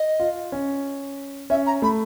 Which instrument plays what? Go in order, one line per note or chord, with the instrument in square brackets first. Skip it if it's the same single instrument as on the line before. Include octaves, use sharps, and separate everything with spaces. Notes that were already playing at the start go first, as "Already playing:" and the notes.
Already playing: [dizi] D#5
[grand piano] F4
C#4
[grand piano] C#4 [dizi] E5
[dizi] A#5
[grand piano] A3 [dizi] B5